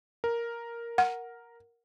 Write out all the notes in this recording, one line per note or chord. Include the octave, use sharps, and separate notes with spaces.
A#4
F#5